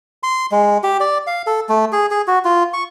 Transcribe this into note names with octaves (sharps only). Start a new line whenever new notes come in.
C6
G#3
G4
D5
F5
A4
A3
G#4
G#4
F#4
F4
C#6